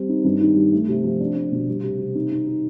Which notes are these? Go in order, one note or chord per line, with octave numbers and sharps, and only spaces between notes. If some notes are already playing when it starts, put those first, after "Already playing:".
Already playing: G3 C4
D#4
G2
D#3
G3
A3
C3
F3
D4
D4
B2
G3
C3
C3
D#4
D#4
D#4